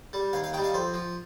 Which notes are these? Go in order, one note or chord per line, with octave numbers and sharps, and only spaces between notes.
G3
D#2 F5
F5
D#3 G3 G5
F5
F2 C5
F3